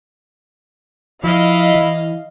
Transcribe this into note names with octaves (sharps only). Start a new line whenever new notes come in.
F3 E4 D#5 F5
E3